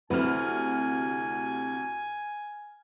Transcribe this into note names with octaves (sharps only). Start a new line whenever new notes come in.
D2 C3 C4 E4 B4 G#5 F6